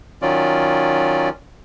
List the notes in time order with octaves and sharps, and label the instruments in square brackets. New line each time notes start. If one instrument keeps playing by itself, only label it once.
[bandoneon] D#3 F#3 C#4 F4 D5